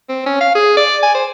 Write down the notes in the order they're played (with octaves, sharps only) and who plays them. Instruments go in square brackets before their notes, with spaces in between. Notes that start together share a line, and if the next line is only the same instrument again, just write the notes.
[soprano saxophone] C4
C#4
F5
G#4
D5
G#5
C5